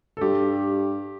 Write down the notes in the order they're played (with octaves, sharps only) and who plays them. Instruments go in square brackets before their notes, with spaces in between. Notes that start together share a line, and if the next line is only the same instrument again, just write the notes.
[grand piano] A4
[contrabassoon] G2 [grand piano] G4